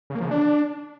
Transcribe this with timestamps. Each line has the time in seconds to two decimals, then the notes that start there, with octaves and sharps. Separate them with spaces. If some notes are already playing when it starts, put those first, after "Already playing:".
0.10 C#3
0.15 A#3
0.20 F3
0.26 C#3
0.31 D4